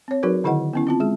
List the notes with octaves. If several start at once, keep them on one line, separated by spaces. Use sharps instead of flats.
C4 C#5
F#3 D#4 F#4 G#4 A#4 B4
D3 D#3 E4 G#4 D#5 F#5
B3 C#4 E4
C4 F4 A5
G#3 G#4